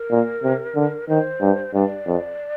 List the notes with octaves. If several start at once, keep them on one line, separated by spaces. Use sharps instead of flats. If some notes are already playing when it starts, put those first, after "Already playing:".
Already playing: A#4
A#2
C3
D3
D#3 C5
G2
G2 D5
F2